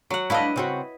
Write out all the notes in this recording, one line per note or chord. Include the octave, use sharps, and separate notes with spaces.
F#3 F#5
A3 D4 E4 B4 D#5 F5
C#3 C4 F#4